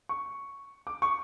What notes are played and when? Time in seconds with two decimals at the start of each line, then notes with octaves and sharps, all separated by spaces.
0.09 C#6
0.87 D6
1.02 C#6